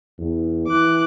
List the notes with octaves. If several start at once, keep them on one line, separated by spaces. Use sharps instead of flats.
E2
E3 D6 F#6